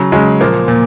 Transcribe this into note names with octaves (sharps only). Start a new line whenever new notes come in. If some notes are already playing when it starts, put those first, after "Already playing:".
Already playing: C#3 F#3
C#3 F#3 G#3
A#2 F3 A#3
A#2